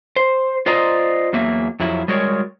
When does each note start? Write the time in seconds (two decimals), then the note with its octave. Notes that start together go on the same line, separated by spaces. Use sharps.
0.16 C5
0.66 F4 C5 D5 D#5 A#5
1.33 E2 F#3 A#3 E5
1.80 F2 F#3 E4
2.08 G3 G#3 F#4 A#4 C#5